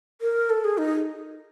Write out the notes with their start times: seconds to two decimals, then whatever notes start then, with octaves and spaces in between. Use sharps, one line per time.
0.21 A#4
0.50 A4
0.64 G#4
0.78 D#4